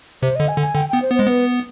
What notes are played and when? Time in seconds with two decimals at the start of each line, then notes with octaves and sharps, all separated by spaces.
0.22 C3 C5
0.36 D3 D#5
0.48 G#5
0.58 D3
0.62 G#5
0.75 D3 G5
0.89 B3 G5
1.02 C5
1.11 B3
1.15 G#3 C5
1.27 B3 B4